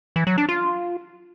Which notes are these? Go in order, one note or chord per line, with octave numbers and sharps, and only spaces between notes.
E3
F#3
D4
F4